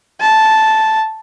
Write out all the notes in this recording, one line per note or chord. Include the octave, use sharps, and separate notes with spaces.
A5